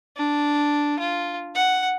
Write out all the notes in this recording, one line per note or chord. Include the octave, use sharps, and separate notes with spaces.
D4
F4
F#5